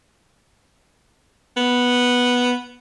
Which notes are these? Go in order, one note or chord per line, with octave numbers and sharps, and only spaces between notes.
B3